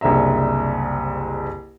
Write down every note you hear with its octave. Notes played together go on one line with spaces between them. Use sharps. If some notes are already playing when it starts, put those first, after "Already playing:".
F#1 C2 D4 E5 A#5